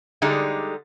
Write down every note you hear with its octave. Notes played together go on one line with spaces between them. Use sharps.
D3 G3 G#3 D#4